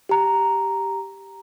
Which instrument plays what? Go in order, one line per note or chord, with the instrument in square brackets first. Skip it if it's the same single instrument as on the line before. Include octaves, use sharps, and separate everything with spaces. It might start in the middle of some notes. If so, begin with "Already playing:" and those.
[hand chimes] G4 A#5